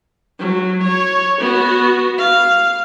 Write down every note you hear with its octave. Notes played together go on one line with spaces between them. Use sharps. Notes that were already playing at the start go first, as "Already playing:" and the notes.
F#3
C#5
B3 F#4
F5